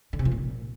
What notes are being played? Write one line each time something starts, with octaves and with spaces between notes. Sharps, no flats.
D3
C3
F3
A#2